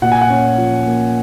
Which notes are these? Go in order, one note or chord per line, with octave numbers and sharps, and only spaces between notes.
A#2 F#5
G#5
F#5
C#4
F3
A#3